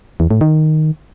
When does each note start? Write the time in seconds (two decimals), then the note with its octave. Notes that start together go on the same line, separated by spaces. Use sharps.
0.20 E2
0.31 A2
0.41 D#3